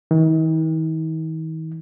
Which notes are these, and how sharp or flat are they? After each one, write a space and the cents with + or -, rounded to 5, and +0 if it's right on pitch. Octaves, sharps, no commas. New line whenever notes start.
D#3 +45